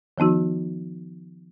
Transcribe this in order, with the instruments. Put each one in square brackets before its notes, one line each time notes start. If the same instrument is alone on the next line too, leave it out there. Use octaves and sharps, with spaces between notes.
[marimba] D#3 F3 B3 D#4 F#4